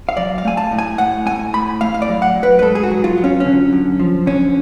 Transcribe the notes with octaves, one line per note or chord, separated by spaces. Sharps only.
F5
F#3 D5
F5
A3 G#5
A5
A2
G#5
A2 F#5
A3 G#5
A2 B5
A3 F5
F5
D5
F#3
F#5
F#3
B4
B4
G#2 A4
G#4
F#4
F#3
F4
F#3
C#4
D3 C#4
F#2
F3
D3 C#4